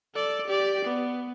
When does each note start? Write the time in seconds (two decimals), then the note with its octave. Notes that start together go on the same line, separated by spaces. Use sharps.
0.14 A4 D5
0.48 G4 D5
0.85 B3